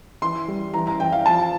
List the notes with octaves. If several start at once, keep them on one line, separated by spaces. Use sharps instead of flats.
E3 C6
G3
E3 A#5
A#5
E3 G5
F5
F3 A5